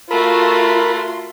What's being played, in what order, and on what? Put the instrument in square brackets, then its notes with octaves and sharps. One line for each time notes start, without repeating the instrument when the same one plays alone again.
[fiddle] A3 F#4 [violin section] F4 C6 [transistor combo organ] A#4 B5